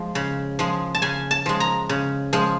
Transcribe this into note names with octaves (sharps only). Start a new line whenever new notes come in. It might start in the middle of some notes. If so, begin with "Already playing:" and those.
Already playing: F3 G#3
C#3
F3 G#3
A5
C#3 G#5
A5
F3 G#3
A#5
C#3
F3 G#3